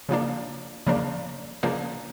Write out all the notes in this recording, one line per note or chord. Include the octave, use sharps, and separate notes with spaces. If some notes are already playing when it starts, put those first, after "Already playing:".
C#3 F3 A#3 D4
C#3 F3 A#3 D4
C#3 F3 A#3 D4